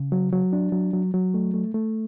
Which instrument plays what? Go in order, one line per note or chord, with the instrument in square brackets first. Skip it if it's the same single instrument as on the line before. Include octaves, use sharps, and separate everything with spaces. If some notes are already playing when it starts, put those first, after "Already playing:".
Already playing: [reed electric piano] C#3
F#3
F#3
D4
F#3
F#3
F#3
A3
A3
A3